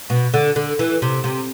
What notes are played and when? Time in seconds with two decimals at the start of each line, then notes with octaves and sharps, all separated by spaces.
0.10 B2
0.34 D3
0.56 D3
0.79 E3
1.02 C3
1.24 C3